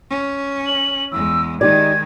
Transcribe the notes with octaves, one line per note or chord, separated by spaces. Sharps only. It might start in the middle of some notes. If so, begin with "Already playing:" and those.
C#4
F#7
E2 G#3 E6
D#3 G#3 D#4 G4 D5 G#6